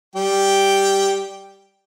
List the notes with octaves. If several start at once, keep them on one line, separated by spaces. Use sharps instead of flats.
G3 G4 G5